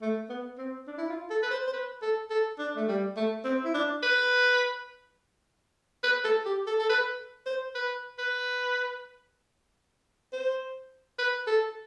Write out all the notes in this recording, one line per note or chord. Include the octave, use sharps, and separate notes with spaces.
A3
B3
C4
D4
E4
F4
A4
B4
C5
C5
B4
A4
A4
D4
A3
G3
A3
C4
E4
D4
B4
B4
A4
G4
A4
A4
B4
C5
B4
B4
C5
B4
A4